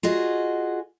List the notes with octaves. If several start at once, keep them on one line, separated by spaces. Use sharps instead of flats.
F4 F#4 G#4 D#5